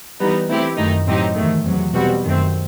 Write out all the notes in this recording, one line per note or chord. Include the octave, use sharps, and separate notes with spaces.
E3 G3 B3 D#4
E3 A3 C4 E4 G4
F#2 D#3 A3 D#4
A2 F#3 C4 D#4 G4
E2 D#3 A3
E2 C3 F#3
B2 G3 C4 F#4
F#2 D#3 A3 C4